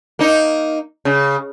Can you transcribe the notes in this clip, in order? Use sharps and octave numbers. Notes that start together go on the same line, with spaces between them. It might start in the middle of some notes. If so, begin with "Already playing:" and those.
A#3 D#4
C#3